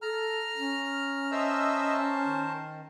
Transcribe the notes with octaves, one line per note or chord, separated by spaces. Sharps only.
A4 A#5 F6
C#4
A#4 C5 D#5 E5 A5 E6
D#3